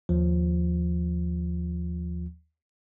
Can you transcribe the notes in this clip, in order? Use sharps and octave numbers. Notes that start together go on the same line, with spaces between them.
D#2 F3